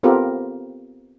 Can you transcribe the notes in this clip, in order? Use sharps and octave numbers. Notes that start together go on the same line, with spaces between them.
B3 C4 F4 G4 A4 A#4